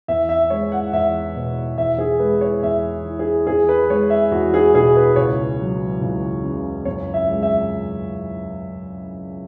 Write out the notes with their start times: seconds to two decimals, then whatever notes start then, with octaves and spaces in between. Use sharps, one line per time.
0.08 E2 E5
0.29 E5
0.50 G#3 C#5
0.72 F#5
0.93 E2 E5
1.36 B2
1.77 E2 E5
1.99 G#4
2.20 G#3 B4
2.41 C#5
2.62 E2 E5
3.04 E3
3.19 G#4
3.47 E2 G#4
3.69 B4
3.90 G#3 C#5
4.10 E5
4.31 E2 F#4
4.54 G#4
4.74 B2 G#4
4.96 B4
5.16 C#2 C#5
5.60 F#3
6.01 C#2
6.44 C#3
6.85 F#2 C#5
7.14 E5
7.29 G#3
7.43 E5